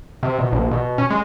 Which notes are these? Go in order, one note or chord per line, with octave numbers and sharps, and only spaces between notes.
C3
B2
A#1
B2
C#4
G#3